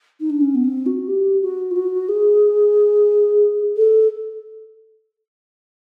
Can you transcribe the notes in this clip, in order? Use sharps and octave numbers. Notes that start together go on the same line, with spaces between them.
D#4
D4
C#4
B3
C4
F#4
G4
F#4
F4
F#4
G#4
A4